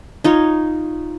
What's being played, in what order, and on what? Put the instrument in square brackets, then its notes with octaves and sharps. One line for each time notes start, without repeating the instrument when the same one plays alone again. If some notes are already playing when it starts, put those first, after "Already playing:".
[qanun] D#4 F4 C#5